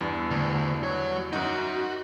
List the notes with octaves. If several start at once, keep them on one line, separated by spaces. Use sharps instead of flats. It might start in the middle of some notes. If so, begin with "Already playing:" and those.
E2 G2
D2
F#4 C#5
F#2 D#4 F#4